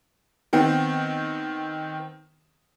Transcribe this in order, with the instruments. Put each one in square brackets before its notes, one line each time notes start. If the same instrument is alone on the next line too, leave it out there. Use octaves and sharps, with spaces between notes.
[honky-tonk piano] D#3 B3 C4